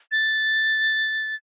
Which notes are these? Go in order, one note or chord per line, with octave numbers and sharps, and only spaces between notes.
A6